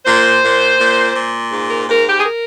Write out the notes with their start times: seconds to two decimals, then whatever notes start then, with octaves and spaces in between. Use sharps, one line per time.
0.05 A#2 C5
0.42 A#2
0.78 A#2
1.15 A#2
1.51 G#2
1.70 A#4
1.88 G#2 A#4
2.07 G4
2.19 G#4
2.25 A#4